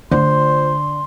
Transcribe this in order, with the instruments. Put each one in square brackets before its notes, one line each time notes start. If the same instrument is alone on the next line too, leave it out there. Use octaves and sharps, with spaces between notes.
[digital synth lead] D3 [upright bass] A3 F4 [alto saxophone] C5 [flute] C6